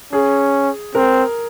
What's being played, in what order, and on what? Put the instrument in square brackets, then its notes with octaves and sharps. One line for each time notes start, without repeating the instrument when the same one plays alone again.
[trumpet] C#4 [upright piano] G#4
[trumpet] C4 [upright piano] A#4